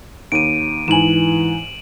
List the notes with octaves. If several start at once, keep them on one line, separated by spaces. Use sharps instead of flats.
D#2 D7 D#7
G#2 E3 G#5 E7 F#7